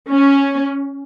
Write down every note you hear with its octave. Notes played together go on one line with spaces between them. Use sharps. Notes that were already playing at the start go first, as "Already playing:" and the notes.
C#4